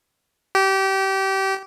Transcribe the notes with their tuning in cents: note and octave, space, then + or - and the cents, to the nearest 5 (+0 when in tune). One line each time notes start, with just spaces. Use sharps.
G4 -25